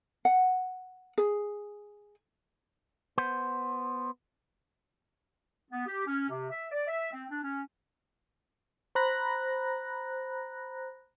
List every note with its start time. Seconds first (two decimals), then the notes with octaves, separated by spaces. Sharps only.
0.25 F#5
1.18 G#4
3.18 B3 C5
5.71 B3
5.86 G4
6.06 C#4
6.29 C3
6.50 E5
6.71 D5
6.87 E5
7.12 C4
7.30 D4
7.43 C#4
8.95 C5 A#5 B5 F#6 A#6